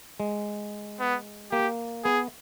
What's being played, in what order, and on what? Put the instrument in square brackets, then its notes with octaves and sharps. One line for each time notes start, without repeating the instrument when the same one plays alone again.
[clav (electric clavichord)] G#3
[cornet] B3
[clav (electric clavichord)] A#3 [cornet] G4
[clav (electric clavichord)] B3 [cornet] G#4